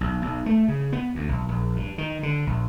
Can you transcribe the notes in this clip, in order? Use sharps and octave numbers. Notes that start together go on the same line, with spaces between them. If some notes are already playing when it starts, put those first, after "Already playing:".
B1
B1
A3
C#3
B3
D2
B1
A#1
G2
D#3
D3
A#1